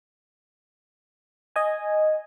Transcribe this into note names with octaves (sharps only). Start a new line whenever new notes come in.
D#5 G#5